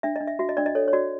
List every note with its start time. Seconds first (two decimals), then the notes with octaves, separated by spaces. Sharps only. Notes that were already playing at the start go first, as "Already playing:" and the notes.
0.03 D4 E5
0.16 D#5
0.21 D4
0.27 E5
0.39 F#4 E5
0.49 D#5
0.57 D4 D5
0.66 D#5
0.75 A4 C#5
0.88 C#5
0.93 F#4 D5